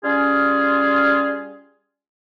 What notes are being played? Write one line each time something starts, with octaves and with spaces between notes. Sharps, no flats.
G3 C#4 F4 G#4